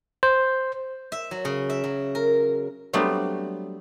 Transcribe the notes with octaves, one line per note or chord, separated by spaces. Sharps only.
C5
E5
F#3
C#3
E5
F#3
A#4
F#3 G3 A3 B3 C4 D4